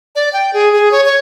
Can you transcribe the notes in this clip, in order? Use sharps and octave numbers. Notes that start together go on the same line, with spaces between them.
D5
G5
G#4
G#4
C#5
C#5